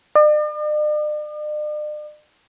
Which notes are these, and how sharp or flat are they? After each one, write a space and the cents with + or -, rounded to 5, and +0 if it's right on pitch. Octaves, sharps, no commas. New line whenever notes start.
D5 +45